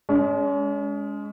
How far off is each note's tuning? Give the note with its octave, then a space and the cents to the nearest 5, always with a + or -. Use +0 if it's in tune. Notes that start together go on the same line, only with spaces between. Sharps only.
G#3 +0 C#4 +40